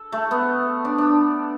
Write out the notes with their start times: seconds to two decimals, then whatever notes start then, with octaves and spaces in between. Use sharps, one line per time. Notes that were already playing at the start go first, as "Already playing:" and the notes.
Already playing: A4
0.12 A3
0.31 B3
0.85 D4
0.98 D4